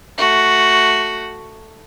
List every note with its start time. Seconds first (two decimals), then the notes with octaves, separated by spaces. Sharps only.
0.18 A3 F#4